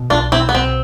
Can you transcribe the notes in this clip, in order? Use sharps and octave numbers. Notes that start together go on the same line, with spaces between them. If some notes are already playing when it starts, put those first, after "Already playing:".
Already playing: B2
B1 D4 F4
B1 C4 E4
B3
B1 C4